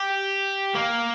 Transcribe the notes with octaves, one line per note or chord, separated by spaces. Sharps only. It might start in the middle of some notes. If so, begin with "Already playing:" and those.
Already playing: G4
A#3